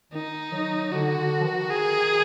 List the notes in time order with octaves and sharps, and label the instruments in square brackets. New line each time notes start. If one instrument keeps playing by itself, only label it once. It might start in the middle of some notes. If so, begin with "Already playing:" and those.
[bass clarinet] D#3 [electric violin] D#4
[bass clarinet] F#3
[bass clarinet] D3 [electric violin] F#4
[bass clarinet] D3
F3
D#3
[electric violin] G#4